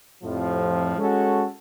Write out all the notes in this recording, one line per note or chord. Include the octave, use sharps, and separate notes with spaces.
F2 A2 C3 F3
G#3 C#4 F#4 A4